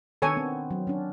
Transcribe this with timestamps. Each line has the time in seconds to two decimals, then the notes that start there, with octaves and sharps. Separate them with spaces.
0.22 D#3 B3 D4 A4 C#5 G#5
0.36 B3 C4
0.71 F#3
0.87 C#4 D4